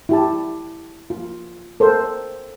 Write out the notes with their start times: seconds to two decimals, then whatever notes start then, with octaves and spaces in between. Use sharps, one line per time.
0.09 E4 G4 A5
1.10 F4
1.80 A4 A#4 C5